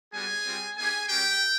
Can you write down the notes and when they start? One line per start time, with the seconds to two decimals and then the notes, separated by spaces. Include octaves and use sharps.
0.13 G3 B3 D4 F#4 G#4 G#5
0.45 G3 C4 F4
0.77 A#3 D#4 G4 G#4 G#5
1.09 G#3 C#4 F#4 G4 G5